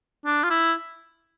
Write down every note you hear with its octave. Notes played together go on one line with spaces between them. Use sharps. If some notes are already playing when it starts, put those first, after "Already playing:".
D4
F4
E4